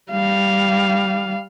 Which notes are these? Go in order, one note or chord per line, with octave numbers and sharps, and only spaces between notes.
G3 F5